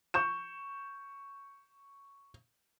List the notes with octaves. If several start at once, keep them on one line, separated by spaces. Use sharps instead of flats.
C#6 G6 E7